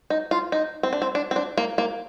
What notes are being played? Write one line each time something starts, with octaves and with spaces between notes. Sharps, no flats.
D#4
F4
D#4
C4
D4
C4
D4
C4
D4
A#3
A#3